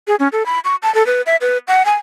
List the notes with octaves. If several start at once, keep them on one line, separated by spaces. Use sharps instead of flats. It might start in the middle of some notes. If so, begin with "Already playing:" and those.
G#4
C#4
A4
B5
C#6
A5
A4
B4
E5
B4
F#5
G#5